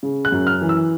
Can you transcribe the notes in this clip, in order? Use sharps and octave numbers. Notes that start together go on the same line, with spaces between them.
C#3
F#6
F#2
F6
E3
E6